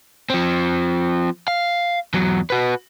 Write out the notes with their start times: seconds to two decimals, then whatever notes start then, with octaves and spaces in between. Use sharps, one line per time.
0.30 F3 C4
1.48 F5
2.14 E2 F#3
2.50 F#4 B4